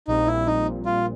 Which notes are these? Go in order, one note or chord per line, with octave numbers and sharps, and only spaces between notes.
A#1 A#2 G3 C4 D#4
E4
D#4
F4